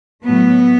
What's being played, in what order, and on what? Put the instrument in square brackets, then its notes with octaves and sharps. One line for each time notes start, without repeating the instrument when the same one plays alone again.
[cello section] A2 F#3 A3 B3